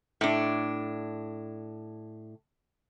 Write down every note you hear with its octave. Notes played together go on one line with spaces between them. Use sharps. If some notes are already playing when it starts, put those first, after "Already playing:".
A2 D4